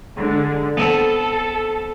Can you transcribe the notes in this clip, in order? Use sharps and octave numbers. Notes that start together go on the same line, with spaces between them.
D3 G#3
B3 C4 A4